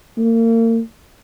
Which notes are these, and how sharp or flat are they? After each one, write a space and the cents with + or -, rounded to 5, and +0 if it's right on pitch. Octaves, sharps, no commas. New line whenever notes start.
A#3 -35